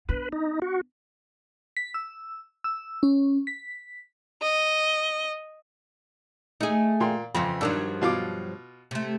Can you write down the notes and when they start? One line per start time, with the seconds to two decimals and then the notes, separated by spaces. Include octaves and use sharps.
0.09 B3 D4 B4
0.32 D#4
0.62 F#4
1.77 B6
1.94 E6
2.64 E6
3.03 C#4
3.47 B6
4.42 D#5
6.60 A3 D#4 G#4
7.00 A#2 G5 C6
7.35 F2 C#3 E3 C4
7.61 G2 D#3 F3 F#3 D4 E6
8.01 B2 F4 D6
8.91 C3 A3